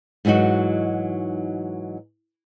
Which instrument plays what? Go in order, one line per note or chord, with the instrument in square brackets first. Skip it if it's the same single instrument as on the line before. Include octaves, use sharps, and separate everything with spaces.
[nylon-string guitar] G#2 E3 F#3 D#4 F#4